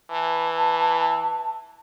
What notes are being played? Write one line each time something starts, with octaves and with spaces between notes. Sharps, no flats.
E3 A5